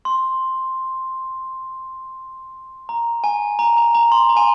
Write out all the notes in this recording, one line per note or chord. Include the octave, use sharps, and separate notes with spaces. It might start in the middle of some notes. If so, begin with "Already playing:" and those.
C6
A#5
G#5
A#5
A#5
A#5
C6
A#5
G#5